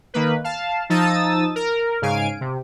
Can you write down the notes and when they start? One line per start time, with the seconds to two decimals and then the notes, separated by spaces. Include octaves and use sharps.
0.14 D#3 A#3 B4
0.44 F5 A5
0.90 F3 D#4 A5 D#6 E6 A6
1.56 A#4
2.02 G#2 C#3 F5 G#5 D7
2.41 C3